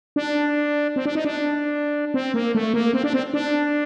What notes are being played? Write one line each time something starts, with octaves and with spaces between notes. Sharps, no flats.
D4
C4
D4
D#4
D4
C4
A#3
A3
A#3
C4
D4
C4
D4